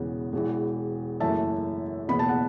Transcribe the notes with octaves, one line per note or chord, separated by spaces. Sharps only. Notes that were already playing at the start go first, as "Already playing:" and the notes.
Already playing: E1 E2 C#3 E3 B3
E1 E2 E3
F#1 F#2 E3 A3 E5 A5
F#1 E2 B2 B3 B5
A5
F#5